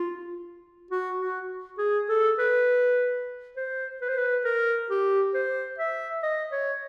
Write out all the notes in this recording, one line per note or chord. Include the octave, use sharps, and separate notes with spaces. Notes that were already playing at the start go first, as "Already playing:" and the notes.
Already playing: F4
F#4
F#4
G#4
A4
B4
C5
B4
C5
B4
A#4
G4
C5
E5
D#5
C#5